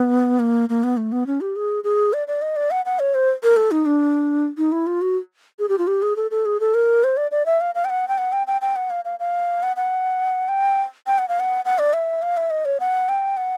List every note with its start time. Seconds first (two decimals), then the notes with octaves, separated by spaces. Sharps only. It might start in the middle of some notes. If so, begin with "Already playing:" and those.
Already playing: B3
0.39 A#3
0.69 A#3
0.84 B3
0.97 A3
1.12 B3
1.27 C#4
1.41 G4
1.56 G#4
1.84 G#4
2.13 D5
2.28 D5
2.42 D#5
2.56 D5
2.71 F#5
2.85 F#5
2.99 C#5
3.15 C5
3.43 A#4
3.57 A4
3.71 D#4
3.86 D4
4.57 D#4
4.72 E4
4.87 F4
5.02 F#4
5.59 G#4
5.69 G4
5.78 F4
5.87 G4
6.02 G#4
6.16 A4
6.31 A4
6.45 G#4
6.60 A4
6.74 A#4
7.04 C5
7.17 D5
7.31 D5
7.46 E5
7.61 F5
7.75 F5
7.85 G5
7.90 F#5
8.08 G5
8.18 F#5
8.32 G5
8.47 G5
8.61 G5
8.76 F#5
8.90 F5
9.05 F5
9.20 F5
9.63 F#5
9.76 F#5
10.49 G5
11.07 G5
11.18 F#5
11.28 F5
11.40 F#5
11.65 F#5
11.79 D5
11.93 E5
12.22 F5
12.37 E5
12.50 D#5
12.65 C#5
12.80 F#5
13.09 G5
13.37 F#5